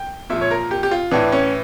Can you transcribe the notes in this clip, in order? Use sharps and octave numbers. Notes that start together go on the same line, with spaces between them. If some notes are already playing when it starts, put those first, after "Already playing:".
Already playing: G5
A#2 F3 E5
C#5
A#4
G4
G4
F4
A2 E3 D4
C#4